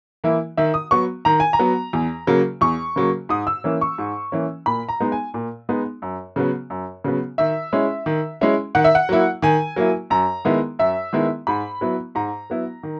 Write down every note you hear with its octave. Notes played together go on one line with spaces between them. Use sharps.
E3 A#3 E4
D#3 E5
D#6
F#3 B3 C#6
D#3 A#5
G#5
A#5
F#3 B3
E2
C#3 F#3 A#3
E2 C#6
C#3 F#3 A#3
G#2 D#6
E6
E3 A#3 C#4
C#6
G#2
E3 A#3 C#4
A#2 B5
A#5
G#3 B3 D#4
G#5
A#2
G#3 B3 D#4
F#2
C#3 F#3 B3
F#2
C#3 F#3 B3
D#3 E5
G#3 C#4 E4
D#3
G#3 C#4 E4
D#3 F#5
E5
F#5
F#3 A#3 E4
D#3 G#5
F#3 A#3 E4
F#2 A#5
D#3 G#3 B3 E4
F#2 E5
D#3 G#3 B3 E4
G#2 B5
F#3 B3 E4
G#2 A#5
F#3 B3 E4
D#3